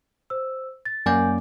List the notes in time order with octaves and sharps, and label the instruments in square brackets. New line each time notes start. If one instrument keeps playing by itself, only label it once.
[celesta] C5 E6
A6
[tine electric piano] F#2 A#3 D5 [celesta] G#5 G6